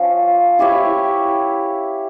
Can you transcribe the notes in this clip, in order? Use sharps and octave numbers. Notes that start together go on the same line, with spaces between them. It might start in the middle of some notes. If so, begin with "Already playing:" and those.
Already playing: F3 C#4
E4 G4 C#5 E5